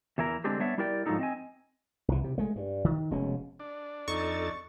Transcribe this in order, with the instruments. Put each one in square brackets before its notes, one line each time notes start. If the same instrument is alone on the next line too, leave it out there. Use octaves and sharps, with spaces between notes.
[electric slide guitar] E2 E3 E4 A#4
D3 G#3 C4 D4 G4 G#4
G3 B3 D4 C#5 E5
G3 E4 G4 A#4 D5 G5
G#2 F3 F#3 D4 D#4 A4
C4 D#5 G#5
[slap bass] C2 E3
C3
G#3 A3
G2
D#3
F1 B2 G#3 C#4
[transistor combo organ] D4
[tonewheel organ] F2 A4 A6 [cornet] D#4 [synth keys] C#6